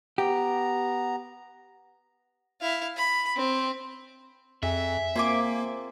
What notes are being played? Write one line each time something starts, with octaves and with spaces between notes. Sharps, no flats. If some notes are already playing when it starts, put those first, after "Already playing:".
B3 G4 A#5
E4 F5
B5
C4
F2 G#4 E5
A#3 C4 F4 A#4 C5 G#5 D6